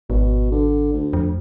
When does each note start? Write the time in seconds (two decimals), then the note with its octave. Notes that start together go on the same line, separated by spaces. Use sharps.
0.10 G#1 B2
0.51 D3
0.94 D2
1.13 F2